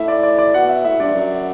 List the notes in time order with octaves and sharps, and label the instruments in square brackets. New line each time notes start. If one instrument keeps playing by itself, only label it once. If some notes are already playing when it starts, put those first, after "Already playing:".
Already playing: [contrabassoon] A2 [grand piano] E5
[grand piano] D5
D5
D5
[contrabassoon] B2 [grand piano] F#5
[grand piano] E5
[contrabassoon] A2 [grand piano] E5
[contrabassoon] G2 [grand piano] D5
[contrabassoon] F#2